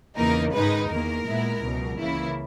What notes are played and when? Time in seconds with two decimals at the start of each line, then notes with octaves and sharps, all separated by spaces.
0.17 E2 C#3 E3 A#3 D#4 A#4
0.52 G#2 D#3 G#3 D#4 B4
0.89 E2 D#3 A#3 A#4
1.25 A#2 G#3 B3 E4
1.61 C#2 B2 F#3
1.98 C#2 C#3 E3 A#3 E4